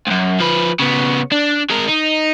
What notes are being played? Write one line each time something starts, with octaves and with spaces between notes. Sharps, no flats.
C#2 F#2
F3 B4
C#3 B3
D4
G#3 A#4
D#4